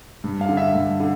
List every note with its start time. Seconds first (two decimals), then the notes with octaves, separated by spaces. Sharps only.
0.24 G2
0.41 F5
0.49 D3
0.57 E5
0.75 G2
1.00 D3